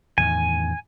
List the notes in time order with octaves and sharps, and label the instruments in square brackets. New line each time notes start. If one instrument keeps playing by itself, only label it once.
[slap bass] E2 A2 D#3 [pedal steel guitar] G#5